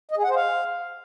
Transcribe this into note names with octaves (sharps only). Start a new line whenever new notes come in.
D#5
G#4
F#5
C5
F5